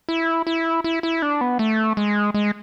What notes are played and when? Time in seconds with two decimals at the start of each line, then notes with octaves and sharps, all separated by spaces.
0.09 E4
0.47 E4
0.84 E4
1.03 E4
1.22 D4
1.41 B3
1.59 A3
1.97 G#3
2.34 G#3